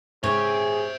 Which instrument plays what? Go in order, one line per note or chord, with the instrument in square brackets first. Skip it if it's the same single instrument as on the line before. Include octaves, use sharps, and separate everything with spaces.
[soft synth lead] G#2 [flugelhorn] G#4 [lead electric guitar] C5 E5 [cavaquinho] C#5